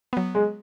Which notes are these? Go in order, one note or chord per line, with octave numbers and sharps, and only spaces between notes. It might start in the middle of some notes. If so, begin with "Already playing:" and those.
F#3 B3
G#3